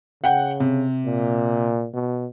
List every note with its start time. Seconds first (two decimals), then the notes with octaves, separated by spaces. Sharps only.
0.24 C#3 F#5 G5
0.60 C3
1.05 A#2
1.93 B2